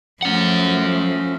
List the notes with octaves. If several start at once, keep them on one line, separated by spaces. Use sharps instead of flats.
F3 A3 C#4 F#5